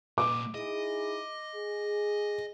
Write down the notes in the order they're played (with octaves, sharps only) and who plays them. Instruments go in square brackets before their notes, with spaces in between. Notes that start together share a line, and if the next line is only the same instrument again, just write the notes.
[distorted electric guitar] A#2 D#5 [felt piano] D6
[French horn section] D#4 E4 G#4 [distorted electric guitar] D#5
[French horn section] G#4